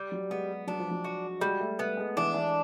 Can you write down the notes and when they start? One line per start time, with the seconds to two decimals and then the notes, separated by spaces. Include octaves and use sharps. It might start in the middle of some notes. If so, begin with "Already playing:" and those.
Already playing: G3
0.12 F#3
0.30 G#3 B3
0.67 F#3 D4
0.80 F3
0.91 F#3
1.04 F#4
1.41 G3 G#3
1.60 A3
1.79 A3 B3
1.97 G#3
2.17 E3 D4
2.34 E3